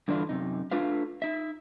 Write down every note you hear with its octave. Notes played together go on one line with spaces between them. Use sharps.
G2 D3 E3 D4 E4 F4
F#2 C3 D#4
A3 D4 F4 B4 F5
D#4 E5